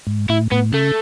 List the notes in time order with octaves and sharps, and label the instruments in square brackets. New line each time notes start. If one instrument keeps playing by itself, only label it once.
[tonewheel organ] G#2
[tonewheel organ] A2 [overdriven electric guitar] E4
[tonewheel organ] A2 [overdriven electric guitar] B3
[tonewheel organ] C#3 [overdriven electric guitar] A3